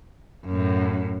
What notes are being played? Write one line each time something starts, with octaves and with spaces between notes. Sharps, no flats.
F#2 A2